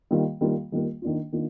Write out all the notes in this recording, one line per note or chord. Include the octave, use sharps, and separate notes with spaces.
D#3 G3 A#3 F4
D#3 G3 A#3 F4
D#3 G3 A#3 F4
D#3 A#3 D4 F4
D#3 A#3 D4 F4